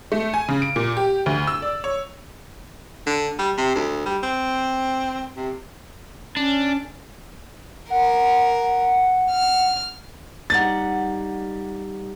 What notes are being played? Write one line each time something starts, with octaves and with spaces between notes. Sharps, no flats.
A3
G#5
C#3
D7
A#2
G4
D2
E6
D5
C#5
D3
G3
C3
D2
G3
C4
C3
C#4 D4
A#4 F#5
F6
G3 D#4 F#5 A6